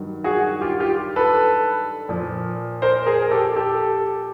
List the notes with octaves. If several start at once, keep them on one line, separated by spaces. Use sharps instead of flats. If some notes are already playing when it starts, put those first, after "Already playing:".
Already playing: G2 D#3 F#3
F#4 G#4
F4 G4
F4 G4
A4 B4
A#2 F3
A#4 C5
G#4 A#4
G4 A4
G4 A4